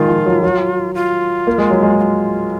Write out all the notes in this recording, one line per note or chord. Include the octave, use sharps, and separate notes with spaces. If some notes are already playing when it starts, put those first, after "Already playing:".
Already playing: D#3 G#3 F4
F3
F#3
F#3
F4
A#3
G#3
F#3
G#3
F#4
F4